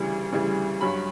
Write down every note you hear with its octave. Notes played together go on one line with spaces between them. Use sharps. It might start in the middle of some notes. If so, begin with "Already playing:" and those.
Already playing: D2 C#3 E3 G3
D2 C#3 E3 G3
G2 F#3 B5